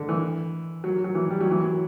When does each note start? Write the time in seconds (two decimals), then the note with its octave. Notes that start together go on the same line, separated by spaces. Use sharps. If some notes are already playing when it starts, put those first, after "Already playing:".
Already playing: D3
0.09 E3
0.84 F#3
1.04 F#3
1.15 E3
1.30 G3
1.41 F#3
1.51 E3
1.61 F#3